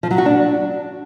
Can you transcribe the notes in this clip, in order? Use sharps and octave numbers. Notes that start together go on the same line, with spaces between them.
F3
F#3
F#4
D4